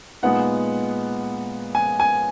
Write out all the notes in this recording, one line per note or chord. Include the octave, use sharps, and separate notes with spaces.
A#2 G#3 B3 D#4 F#5
G#5
G#5